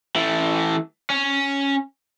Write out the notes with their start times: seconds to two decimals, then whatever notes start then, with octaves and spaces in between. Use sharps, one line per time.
0.16 E3 A3
1.10 C#4